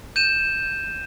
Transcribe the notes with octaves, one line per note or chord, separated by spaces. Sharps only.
G6 D#7 E7